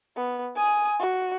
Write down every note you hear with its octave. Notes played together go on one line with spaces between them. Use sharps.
B3
G#5 D#6
F#4